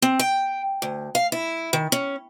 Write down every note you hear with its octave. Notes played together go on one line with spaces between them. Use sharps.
C4
G5
D2
F5
E4
D#3
C#4